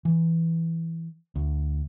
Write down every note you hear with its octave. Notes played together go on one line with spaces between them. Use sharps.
E3
D2